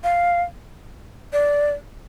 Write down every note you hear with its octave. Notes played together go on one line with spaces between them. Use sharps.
F5
D5